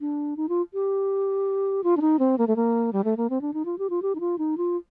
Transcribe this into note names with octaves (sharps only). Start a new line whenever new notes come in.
D4
D#4
F4
G4
F4
D4
D#4
C4
A#3
A3
A#3
G3
A3
A#3
C4
D4
D#4
F4
G4
F4
G4
D#4
F4
D#4
F4